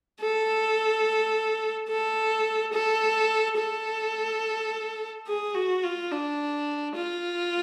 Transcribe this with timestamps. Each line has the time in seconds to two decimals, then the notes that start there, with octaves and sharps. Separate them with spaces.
0.20 A4
1.89 A4
2.73 A4
3.57 A4
5.27 G#4
5.54 F#4
5.83 F4
6.12 D4
6.95 F4